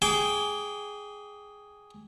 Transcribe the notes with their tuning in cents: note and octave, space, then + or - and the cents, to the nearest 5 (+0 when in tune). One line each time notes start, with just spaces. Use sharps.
G#4 +0 G5 +0 D6 -30